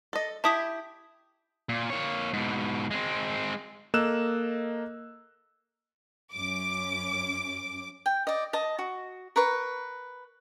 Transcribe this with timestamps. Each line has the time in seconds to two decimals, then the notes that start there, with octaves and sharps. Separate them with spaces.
0.13 A4 D#5
0.44 E4 G4 A5 D#6 B6
1.69 A#2
1.90 A#3 C#5
2.33 G#2 B2
2.91 G#3 C4
3.94 A#3 A4 D#5 E6 F#6 E7
6.34 F#2 C#4 D6
8.06 G5
8.27 D5 D#5
8.53 D#5 A5
8.79 F#4
9.36 A#4 B4 C#6